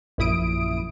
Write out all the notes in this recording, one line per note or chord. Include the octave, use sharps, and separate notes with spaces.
A#1 F#2 E4 D#6 D7